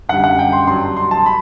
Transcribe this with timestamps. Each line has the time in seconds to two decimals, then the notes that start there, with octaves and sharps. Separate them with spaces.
0.09 F#2 D3 G3 F#5
0.24 F#5
0.39 G5
0.53 C6
0.67 G2 F#3 C6
0.97 C6
1.11 A5
1.26 B5